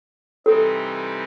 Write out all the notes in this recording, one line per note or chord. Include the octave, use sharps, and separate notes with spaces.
C3 E3 G3 C4 D#4 A4